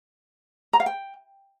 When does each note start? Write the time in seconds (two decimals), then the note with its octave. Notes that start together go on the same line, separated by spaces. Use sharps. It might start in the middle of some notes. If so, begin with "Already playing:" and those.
0.73 A#5
0.80 F5
0.86 G5